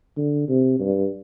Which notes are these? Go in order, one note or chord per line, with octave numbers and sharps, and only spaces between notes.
D3
C3
G2